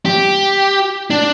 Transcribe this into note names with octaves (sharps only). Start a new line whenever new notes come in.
G4
D4